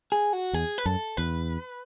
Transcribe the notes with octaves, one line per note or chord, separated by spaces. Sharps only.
G#4
F#4
E2 G#4
B4
F#2 A4
E2 B4